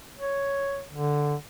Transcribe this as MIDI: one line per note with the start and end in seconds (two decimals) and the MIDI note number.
0.18 0.83 73
0.90 1.35 50